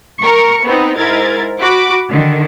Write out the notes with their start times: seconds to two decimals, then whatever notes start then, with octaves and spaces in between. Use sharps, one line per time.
0.21 A#4 C#6
0.64 B3 C4 D#4
0.97 G#2 E4 A#4 G#6 A6
1.60 F#4 B5 D6
2.10 D3 D#3